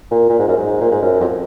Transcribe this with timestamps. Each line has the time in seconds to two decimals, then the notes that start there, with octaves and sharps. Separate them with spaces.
0.11 A#2
0.29 A#2
0.38 G#2
0.48 F#2
0.57 G#2
0.81 A#2
0.91 G#2
1.02 F#2
1.20 F2